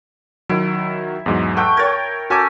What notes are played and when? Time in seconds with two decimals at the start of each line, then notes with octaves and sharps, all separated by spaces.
0.49 D#3 F#3 E4
1.26 E2 G#2 F#3
1.57 A3 F#5 G5
1.77 A#4 C#5 G5 G#6 A6
2.30 C#4 F#4 A4 G#5 D6